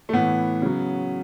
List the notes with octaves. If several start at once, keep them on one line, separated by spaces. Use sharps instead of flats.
A3
A2 E3 B3
C#3 F#3